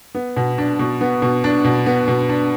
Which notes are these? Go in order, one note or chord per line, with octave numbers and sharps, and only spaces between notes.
B3
B2
D4
B2
B3
B2
D4
B2
B3
B2
D4